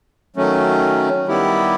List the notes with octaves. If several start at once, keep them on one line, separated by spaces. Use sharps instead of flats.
D#3 F#3 A3 C#4
D#3 G3 B3 E4 G4